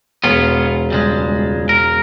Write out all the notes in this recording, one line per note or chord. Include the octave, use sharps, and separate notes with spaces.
E1 B3 C#4 F4 B6
C#2 G3 G#3
A#4